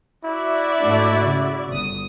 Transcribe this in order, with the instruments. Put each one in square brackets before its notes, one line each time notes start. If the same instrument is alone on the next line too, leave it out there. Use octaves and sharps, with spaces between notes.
[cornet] E4 [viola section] F#4 D5 E5
[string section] G#2 A3 D4
C#3
G1 D#6